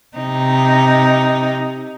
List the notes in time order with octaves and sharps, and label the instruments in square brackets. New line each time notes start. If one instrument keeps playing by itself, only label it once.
[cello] C3 D#4